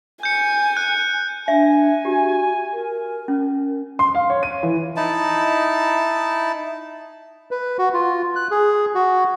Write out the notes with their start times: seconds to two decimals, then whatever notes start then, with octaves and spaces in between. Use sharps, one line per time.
0.23 G#5 G6 C#7
0.77 F#6
1.48 D4 E5 G#5
2.05 F#4 G4
2.73 A#4
3.28 C#4
3.99 C6
4.15 F5
4.30 C#5
4.43 D#7
4.63 E3
4.97 D#4 E4 A5
7.51 B4
7.79 F#4
7.94 F4
8.36 F#6
8.51 G#4
8.95 F#4